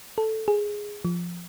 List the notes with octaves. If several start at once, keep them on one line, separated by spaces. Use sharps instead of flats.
A4
G#4
F3